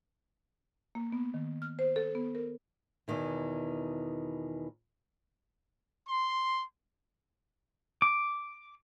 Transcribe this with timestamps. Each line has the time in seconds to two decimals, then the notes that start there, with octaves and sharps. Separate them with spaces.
0.95 A#3
1.12 B3
1.34 D#3
1.62 F6
1.79 C5
1.96 A4
2.15 B3
2.35 A#4
3.08 E2 B2 D#3 E3
6.07 C6
8.02 D6